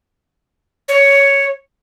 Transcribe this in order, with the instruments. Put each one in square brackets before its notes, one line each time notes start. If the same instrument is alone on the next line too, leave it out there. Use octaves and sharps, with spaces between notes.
[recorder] C#5